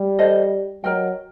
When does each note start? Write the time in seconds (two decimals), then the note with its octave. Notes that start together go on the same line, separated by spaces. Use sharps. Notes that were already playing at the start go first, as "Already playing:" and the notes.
Already playing: G3
0.19 A4 C5 D#5
0.84 F#3 A#4 D#5 G5